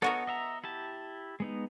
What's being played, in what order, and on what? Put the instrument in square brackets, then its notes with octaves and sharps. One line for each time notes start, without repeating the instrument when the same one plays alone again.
[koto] B3 F#4 A#4 [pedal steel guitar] A4 C#5 D#5
[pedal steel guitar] D#5 E5 A#5
E4 G4 A5
G#3 B3 D#4